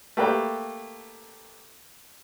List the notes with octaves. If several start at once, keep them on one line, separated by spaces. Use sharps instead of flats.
A3 A#3 G4 B4 D5 G5